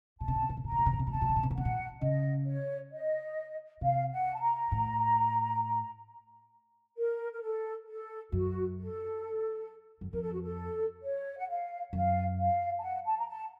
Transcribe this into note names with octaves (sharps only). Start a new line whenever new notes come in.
A#2 A5
C3
A#2
C3
A#2
C3
A#2 A#5
C3
A#2
C3
A#2
C3
A#5
A#2
C3 A5
A#2
C3
A#2
C3
A#2
C3 F#5
A#2
C#3 D#5
C#5
D#5
C3 F5
F#5
A5
A#5
A2
A#4
A#4
A4
A4
F#2 F#4
A4
F#2
F2 A#4
A4
F#4
A4
C#5
F#5
F5
F#2 F5
F5
A5
F#5
A5
A#5
A5